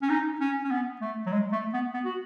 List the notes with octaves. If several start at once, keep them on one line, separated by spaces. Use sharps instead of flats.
C#4
D#4
C#4
C#4
B3
A3
F#3
G#3
A3
B3
B3
F#4